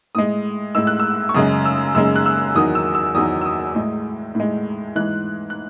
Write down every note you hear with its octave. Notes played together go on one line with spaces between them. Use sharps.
A2 G#3 D#6
A2 G#3 E6
F#6
E6
C#6
F#2 C#3 G#3 D#6
E6
F#2 C#3 G#3 E6
F#6
E6
E2 D#3 F#3 D#6
E6
E6
E2 D#3 F#3 D#6
E6
D#6
A2 G#3
A2 G#3
G#2 E3 G#3 F#6
F#6